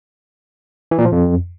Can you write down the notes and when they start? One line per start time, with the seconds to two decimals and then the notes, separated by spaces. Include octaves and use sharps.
0.91 E3
0.98 A#2
1.05 F3
1.12 F2